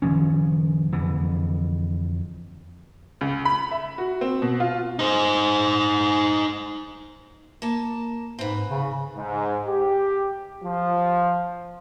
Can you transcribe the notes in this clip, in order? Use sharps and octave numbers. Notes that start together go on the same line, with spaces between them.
F#1 D#3 F3 C#4
F2 D3 E3
C#2
B5
E5
F#4
C4
B2
F4
D#4 C5
A#3 A5
G#2 C4 B4
C#3
G#2
G4
F3